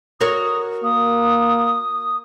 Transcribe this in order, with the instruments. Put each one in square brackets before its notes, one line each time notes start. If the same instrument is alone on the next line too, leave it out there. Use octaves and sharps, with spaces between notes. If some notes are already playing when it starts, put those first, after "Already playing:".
[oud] F#4 A#4 C#5 [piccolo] D#6
[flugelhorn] A#3 [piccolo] D#6